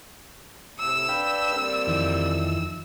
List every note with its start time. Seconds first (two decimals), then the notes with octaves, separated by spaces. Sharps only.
0.79 A2 C3 E6
1.09 D4 B4 F5 G5 B5
1.52 G3 A#3 C4
1.87 F2 D#3 E3